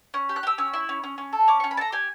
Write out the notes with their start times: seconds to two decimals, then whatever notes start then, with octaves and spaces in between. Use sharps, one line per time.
0.14 C#4
0.29 G4
0.36 F#6
0.43 G4 E6
0.58 C#4 E6
0.73 E4
0.89 C#4
1.04 C#4
1.18 C#4
1.33 A4
1.48 C#4 D6
1.60 C#4 C#6
1.71 B5
1.77 A4 A5 A#5
1.92 G4 G#5